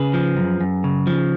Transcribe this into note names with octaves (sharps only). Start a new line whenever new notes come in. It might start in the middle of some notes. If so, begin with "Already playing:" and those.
Already playing: C#3 G#4 B4
F3
F#2
F#2
C#3
F3